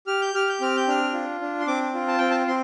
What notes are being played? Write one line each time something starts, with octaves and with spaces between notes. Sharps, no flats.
G4 F6
G6
G4 F6
G6
C4 F6
G6
D4 F6
F4
D4
C6
C4 D6
F4
A5
C4 G5
A5
C4 C6